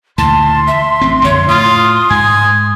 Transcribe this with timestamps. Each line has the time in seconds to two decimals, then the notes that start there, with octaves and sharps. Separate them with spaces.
0.18 D2 A#2 E3 A5 C6
0.67 E5
1.01 A1 C4
1.24 F2 A#2 D3 C#5
1.49 A2 F4 D#6
2.10 G#2 G#5